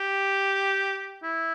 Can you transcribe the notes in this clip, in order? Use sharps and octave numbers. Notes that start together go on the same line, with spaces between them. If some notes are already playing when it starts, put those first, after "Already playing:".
Already playing: G4
E4